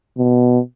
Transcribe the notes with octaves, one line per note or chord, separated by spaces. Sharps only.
B2